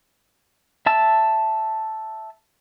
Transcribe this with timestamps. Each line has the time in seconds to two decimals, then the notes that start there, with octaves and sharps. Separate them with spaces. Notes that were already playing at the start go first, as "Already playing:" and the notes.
0.86 E5 A5 E6